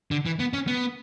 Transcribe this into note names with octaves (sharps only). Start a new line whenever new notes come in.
D3
E3
B3
C#4
B3